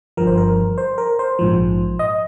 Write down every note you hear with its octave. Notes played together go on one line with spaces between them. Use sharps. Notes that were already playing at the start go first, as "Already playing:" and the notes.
G1 G2 F3 A#4
C5
A#4
C5
A#4
C5
A#1 G#2 F3
D#5